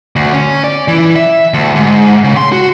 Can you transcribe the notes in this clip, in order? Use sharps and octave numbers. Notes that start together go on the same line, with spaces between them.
D2
C#4
D5
E3
E5
D2
G#2
C#3
C6
F#4